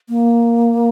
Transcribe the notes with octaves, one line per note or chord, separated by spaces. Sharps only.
A#3